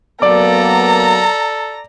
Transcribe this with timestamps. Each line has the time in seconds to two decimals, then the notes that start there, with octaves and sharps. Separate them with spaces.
0.22 F#3 A#3 B3 A4 D5 A#5 D6